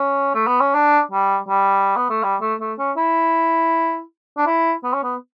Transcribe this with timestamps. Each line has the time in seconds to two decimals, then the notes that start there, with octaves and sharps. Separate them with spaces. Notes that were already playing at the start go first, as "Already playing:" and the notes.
Already playing: C#4
0.35 A3
0.47 B3
0.61 C#4
0.74 D4
1.11 G3
1.49 G3
1.96 B3
2.10 A3
2.23 G3
2.41 A3
2.60 A3
2.79 C#4
2.97 E4
4.38 D4
4.47 E4
4.84 B3
4.94 C#4
5.03 B3